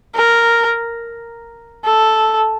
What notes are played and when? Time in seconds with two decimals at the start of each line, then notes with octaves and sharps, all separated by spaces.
0.15 A#4
1.85 A4